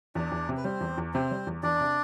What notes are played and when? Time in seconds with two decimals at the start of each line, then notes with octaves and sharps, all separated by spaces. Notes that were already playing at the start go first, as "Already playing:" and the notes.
0.15 E2 D4 D5
0.31 E2
0.49 C3
0.57 B4
0.64 G3 C4 C5
0.81 E2
0.98 E2
1.14 C3 C4 C5
1.31 G3
1.47 E2
1.63 E2 D4 D5
1.80 C3